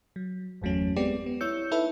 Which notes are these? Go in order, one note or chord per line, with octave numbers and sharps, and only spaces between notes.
F#3
G1 E2 F#3 A3 C#4
G#3 B3 C4 G4 D5
B3
E4 C#5 E6 G6 C#7
D#4 E4 A4 B4 E5